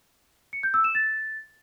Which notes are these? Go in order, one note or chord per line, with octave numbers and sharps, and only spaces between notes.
C#7
G6
E6
E7
A6